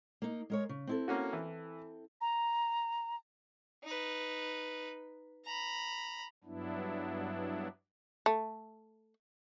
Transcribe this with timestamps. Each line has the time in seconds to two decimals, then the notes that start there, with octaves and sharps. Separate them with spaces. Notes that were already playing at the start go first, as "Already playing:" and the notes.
0.22 A#3 D#4
0.50 G#3 A#4 C#5
0.69 C#3
0.87 C4 E4 A4
1.08 A#3 C#4 F#4
1.33 E3
2.21 A#5
3.84 D#4 B4
5.45 A#5 B5
6.44 G2 F#3 B3 D4 E4
8.26 A3